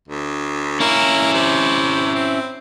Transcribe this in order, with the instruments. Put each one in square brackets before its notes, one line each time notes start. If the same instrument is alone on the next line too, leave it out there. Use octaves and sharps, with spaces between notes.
[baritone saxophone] D2
[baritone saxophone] A#3 [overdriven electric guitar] C#4 E4
[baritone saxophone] C3
C4